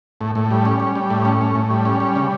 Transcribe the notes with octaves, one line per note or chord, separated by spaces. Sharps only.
A2
A2
G3
C#4
G3
G3
A2
C#4
A2
A2
G3
C#4
G3
C#3